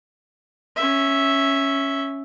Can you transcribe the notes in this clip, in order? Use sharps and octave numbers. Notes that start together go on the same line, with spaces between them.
C#4 E5